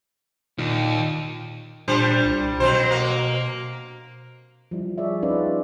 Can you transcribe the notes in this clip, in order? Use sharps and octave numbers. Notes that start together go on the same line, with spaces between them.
D#2 A#2 D#3
A#2 G3 D4 C5
C2
B2 F#3 C4 C5
A#3
F3 G3 E4
G#4 C#5 D5 E5
C#4 D#4 F4 G#4 B4 D5